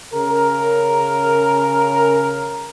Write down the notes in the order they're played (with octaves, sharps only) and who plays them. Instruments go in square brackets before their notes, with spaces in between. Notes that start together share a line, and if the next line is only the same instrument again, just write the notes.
[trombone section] C#3 A#4